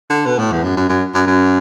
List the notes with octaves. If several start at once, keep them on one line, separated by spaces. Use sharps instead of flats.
D3
B2
A2
E2
F#2
F#2
F#2
F#2
F#2